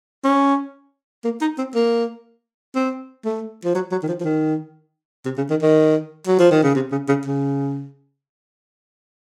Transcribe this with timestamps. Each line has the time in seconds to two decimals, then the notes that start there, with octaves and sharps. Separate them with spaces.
0.24 C#4
1.24 A#3
1.41 D#4
1.58 C4
1.74 A#3
2.75 C4
3.25 A3
3.64 F3
3.75 F#3
3.91 F#3
4.03 D#3
4.08 F3
4.20 F3
4.24 D#3
5.25 C3
5.37 C#3
5.50 D#3
5.62 D#3
6.27 F#3
6.39 F3
6.51 D#3
6.63 C#3
6.75 C3
6.92 C#3
7.08 C#3
7.25 C#3